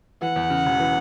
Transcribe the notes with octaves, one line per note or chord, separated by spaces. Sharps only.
E3 F#5
E2
C#3
E1
E3